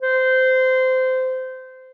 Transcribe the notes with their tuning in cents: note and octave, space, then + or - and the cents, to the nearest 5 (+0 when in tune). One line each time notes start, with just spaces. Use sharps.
C5 -20